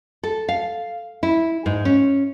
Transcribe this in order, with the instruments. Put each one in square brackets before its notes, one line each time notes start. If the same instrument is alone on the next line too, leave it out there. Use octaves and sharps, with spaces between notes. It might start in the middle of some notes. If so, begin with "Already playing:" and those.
[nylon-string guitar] A4
F5
E4
G#2
C#4